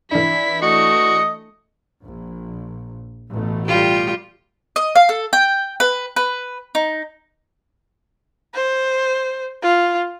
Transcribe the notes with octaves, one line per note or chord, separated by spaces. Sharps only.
E3 D4 E4 B6
A3 F#4 D#5 C#7
A#1
A1 B2 A3
G3 F4 G4
D#5
F5
A4
G5
B4
B4
D#4
C5
F4